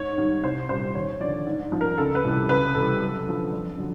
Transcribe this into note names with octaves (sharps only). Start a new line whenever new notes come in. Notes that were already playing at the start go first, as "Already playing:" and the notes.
Already playing: G#2 C#5
D#3 G3
C2 C5
A#2 G3 C5
D#2 C#5
D3 F3 D5
G#2
F3
A#4
C#2 A4
B4
C3 E3 G3
C#2 B4
C3 E3 G3 A4
F#2
D3 F3
F2
D3 F#3